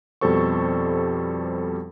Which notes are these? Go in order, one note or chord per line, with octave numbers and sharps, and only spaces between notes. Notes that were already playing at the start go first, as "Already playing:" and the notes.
F2 B2 G3 A4 C5 C#6